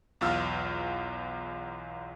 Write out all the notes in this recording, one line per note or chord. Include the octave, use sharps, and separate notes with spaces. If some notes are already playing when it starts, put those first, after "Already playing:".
B1 E2 F4 E6 F6